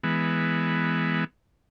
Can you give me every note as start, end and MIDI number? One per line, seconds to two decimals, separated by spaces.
0.03 1.24 52
0.03 1.24 56
0.03 1.24 59